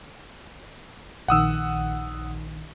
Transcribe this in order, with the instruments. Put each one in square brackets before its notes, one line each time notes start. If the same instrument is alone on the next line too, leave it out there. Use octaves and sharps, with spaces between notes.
[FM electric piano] A#1 D#3 [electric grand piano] F#5 D#6 E6